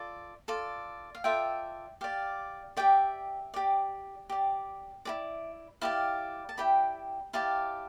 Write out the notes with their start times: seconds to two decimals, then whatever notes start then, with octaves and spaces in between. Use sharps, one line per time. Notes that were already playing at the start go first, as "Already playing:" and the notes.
Already playing: F4 A4 D5
0.48 F4 A4 D5
1.15 F5
1.24 F4 A4 D5 E5 G5
2.01 G4 D5 F5
2.77 G4 D5 E5 G5
3.54 G4 D5
4.30 G4 D5
5.05 E4 G4 D5
5.81 E4 G4 D5 F5 A5
6.49 A5
6.57 E4 G4 D5 G5 B5
7.33 E4 G4 D5 F5 A5